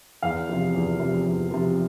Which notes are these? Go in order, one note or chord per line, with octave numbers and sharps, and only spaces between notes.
E2 F5
C3 F3
E2
C3 F3
E2
C3 F3